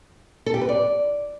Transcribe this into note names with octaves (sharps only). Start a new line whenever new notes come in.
A4
G4
B4
D5